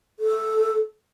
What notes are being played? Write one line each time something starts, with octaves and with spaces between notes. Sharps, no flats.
A4